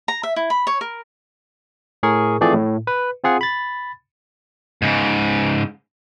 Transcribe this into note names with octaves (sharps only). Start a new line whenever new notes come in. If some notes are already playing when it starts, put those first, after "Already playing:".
A#5
E5
E4
B5
C#5
A#4
A2 G#4 A#4 C#6
E3 F3 A3 C4 G#4 D5
A2
B4
C4 F4 G#4 F#5
B5 A6
G#2 C#3